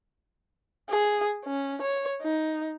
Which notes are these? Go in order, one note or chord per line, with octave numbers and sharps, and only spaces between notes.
G#4
C#4
C#5
D#4